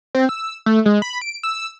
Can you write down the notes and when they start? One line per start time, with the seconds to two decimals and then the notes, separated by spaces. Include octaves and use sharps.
0.15 C4
0.29 E6
0.66 A3
0.86 G#3
1.02 B5
1.21 D7
1.43 E6